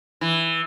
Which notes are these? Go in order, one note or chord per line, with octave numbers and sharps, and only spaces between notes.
E3